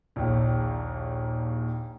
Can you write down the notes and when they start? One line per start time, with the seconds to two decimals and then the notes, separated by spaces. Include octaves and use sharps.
0.16 A#1 D#2